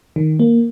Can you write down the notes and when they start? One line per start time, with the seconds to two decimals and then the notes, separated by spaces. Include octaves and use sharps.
0.16 D#3
0.40 A#3